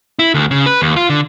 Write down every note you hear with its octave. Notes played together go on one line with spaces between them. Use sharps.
E4
D2
C#3
B4
D#2
F4
D3